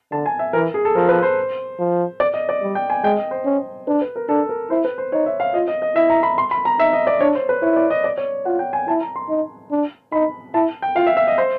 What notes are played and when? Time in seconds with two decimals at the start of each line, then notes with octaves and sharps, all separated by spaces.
0.12 D3 A5
0.26 G#5
0.39 E5
0.53 E3 A#4
0.74 G#4
0.85 A4
0.95 F3 A#4
1.09 B4
1.22 C5
1.79 F3
2.20 D5
2.34 D#5
2.49 D5
2.62 G3
2.75 G5
2.90 G#5
3.04 G#3 G5
3.17 D#5
3.31 C5
3.45 C#4
3.87 D4 B4
4.01 B4
4.16 A#4
4.29 D4 A4
4.49 A#4
4.70 E4 C5
4.85 B4
4.98 C5
5.12 D#4 C#5
5.26 E5
5.40 F5
5.54 F4 D#5
5.68 D#5
5.82 D#5
5.95 E4 E5
6.10 A#5
6.23 B5
6.38 C6
6.51 B5
6.65 A#5
6.79 D#4 E5
6.93 D#5
7.07 D5
7.21 D4 C#5
7.35 C5
7.49 B4
7.62 E4 C#5
7.76 D5
7.90 D#5
8.04 D5
8.17 C#5
8.45 F4 F#5
8.59 G5
8.73 G#5
8.88 E4 A5
9.01 A#5
9.16 C6
9.29 D#4
9.71 D4
10.12 D#4 B5
10.54 E4 A5
10.82 G5
10.96 F4 F5
11.07 E5
11.17 E5
11.27 D#5
11.38 C5